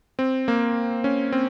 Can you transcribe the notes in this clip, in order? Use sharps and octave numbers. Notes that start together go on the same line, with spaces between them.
C4
A#3
C#4
C4